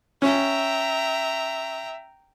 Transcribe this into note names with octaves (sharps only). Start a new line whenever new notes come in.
C#4 E5 G5 A#5